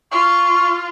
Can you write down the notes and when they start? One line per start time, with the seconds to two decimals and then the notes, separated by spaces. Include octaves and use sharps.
0.11 F4 C#6